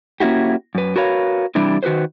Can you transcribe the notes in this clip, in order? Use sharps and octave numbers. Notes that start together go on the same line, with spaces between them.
A#3 C#4 E4 F#4 G4
F#2 B4
F#4 A#4 B4 C#5 F5
C3 E3 G3 D4 E4
D#3 F#4 G#4 B4 C5